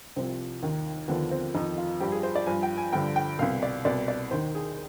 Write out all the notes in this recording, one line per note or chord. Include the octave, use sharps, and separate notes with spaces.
C2 C3 F3 C4
D#2 D#3
D#2 D3 F3 B3
C4
F2 D#3 D#4
F4
G2 F3 G4
G#4
C5
D5
G2 F3 G#5
G5
G#5
G2 D3 F3 G5
G5
C2 B2 F5
D5
C2 B2 D5
D5
D#2 D#3 C5
G#4